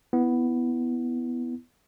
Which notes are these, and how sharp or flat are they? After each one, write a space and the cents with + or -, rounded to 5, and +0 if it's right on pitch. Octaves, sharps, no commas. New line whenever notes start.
B3 +0 E4 +0